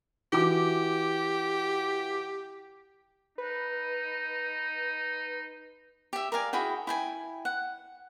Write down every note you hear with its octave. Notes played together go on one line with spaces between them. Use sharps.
E3 F#4 G4 D6
D#4 B4
G4 E5
A#4 D5 F5 G#5
E4 F#4 G#4 G5
E4 G5 G#5
F#5